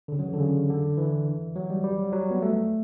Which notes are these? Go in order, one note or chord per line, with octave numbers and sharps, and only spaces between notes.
D3
C#3
F#3
E3
D3
C#3
D3
E3
F#3
G3
G3
F#3
F#3
B3
A3